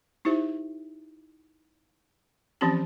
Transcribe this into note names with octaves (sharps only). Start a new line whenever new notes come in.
D#4 E4 G4 C5 E5
E3 F3 C4 C#4 G4 A5